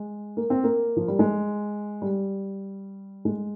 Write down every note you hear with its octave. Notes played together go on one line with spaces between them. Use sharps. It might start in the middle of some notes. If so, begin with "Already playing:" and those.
Already playing: G#3
A#3
C4
A#3
F3
G3
G#3
G3
G#3